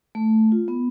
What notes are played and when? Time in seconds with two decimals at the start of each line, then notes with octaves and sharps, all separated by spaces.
0.15 A3
0.52 F4
0.68 B3